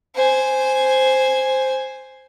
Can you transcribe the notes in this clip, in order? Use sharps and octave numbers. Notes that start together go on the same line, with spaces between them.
C5 G#5